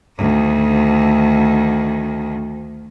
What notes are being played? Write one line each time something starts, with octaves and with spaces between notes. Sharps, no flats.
D2 D#3